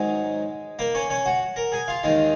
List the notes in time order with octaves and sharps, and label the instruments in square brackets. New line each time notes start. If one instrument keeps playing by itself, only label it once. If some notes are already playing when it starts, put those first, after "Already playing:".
Already playing: [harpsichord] G#2 D#3 F#3 G#3 G#4
A#3 A#4
C#4 C#5
C#4 C#5
F#4 F#5
A#4 A#5
G#4 G#5
F4 F5
D#2 D#3 G#3